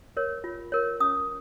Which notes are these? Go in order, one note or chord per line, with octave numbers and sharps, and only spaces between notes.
A#4 C#5
F4
A#4 C#5
C#4 D#6